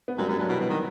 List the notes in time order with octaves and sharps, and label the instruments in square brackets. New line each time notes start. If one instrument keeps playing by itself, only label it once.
[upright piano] B3
[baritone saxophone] F#2 [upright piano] G3
[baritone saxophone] F#2 [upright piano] G3
[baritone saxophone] G2 [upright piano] F#3
[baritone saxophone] B2 [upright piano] E3
[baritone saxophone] B2
D#3